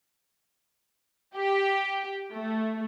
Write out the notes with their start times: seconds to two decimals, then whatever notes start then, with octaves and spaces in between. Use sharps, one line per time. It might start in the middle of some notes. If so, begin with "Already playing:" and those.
1.37 G4
2.32 A3